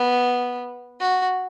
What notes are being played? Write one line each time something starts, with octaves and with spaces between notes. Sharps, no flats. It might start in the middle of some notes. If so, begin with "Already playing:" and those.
Already playing: B3
F#4